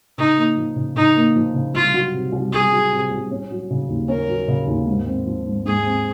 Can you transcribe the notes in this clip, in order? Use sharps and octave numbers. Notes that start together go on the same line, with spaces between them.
C#3 D#4
A#3
F3
C#3
C#3 D#4
A#3
F3
C#3
C2 F4
F#3
C3
C2
C2 G#4
F#3
C3
C2
C#4
F#3
C#3
D#2
C#4 A#4
F#3
C#3
D#2
G#2
C4
F3
G#2
G#2 G#4
C4